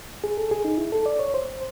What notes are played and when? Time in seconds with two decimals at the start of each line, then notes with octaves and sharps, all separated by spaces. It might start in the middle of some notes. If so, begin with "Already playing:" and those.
0.24 G#4
0.37 A4
0.51 G#4
0.65 D#4
0.78 E4
0.92 A4
1.06 D5
1.19 C#5
1.34 C5